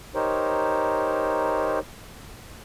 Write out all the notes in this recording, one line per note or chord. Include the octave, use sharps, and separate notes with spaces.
D#4 G4 A#4 C5 C#5